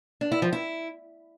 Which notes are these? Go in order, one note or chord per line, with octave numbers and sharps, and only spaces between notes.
D4
E4
F3
E4